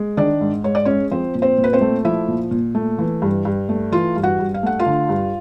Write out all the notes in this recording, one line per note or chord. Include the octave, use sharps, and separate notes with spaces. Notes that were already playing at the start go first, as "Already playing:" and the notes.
Already playing: G#3
D#3 D4 D5
G#2
G#2 C#5
D5
G#3 C#4 C#5
F3 C4 C5
A#2
C4 C5
A#2
B4
C4 C5
A3
F3 E4 E5
A#2
A#2
A3
E3
G2
G2
A3
E3 F4 F5
G2
F#4 F#5
G2
F5
A3 F#5
F4 F5
D3
G2